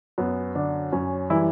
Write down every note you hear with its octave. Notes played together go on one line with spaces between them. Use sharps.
F#2 B3
D3 D4
F#2 C#4
E3 G3 E4